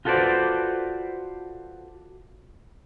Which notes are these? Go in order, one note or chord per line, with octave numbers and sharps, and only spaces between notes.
F4 F#4 A4 B4 C5 D5